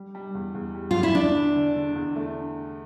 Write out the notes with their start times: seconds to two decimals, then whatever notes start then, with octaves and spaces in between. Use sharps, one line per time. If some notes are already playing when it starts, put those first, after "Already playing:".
Already playing: G3
0.15 G3
0.34 E2
0.54 E2
0.75 G3
0.91 E2 F4
1.03 E4
1.15 D3 D4
1.35 D3
1.55 D3
1.76 D3
1.96 E2
2.16 A3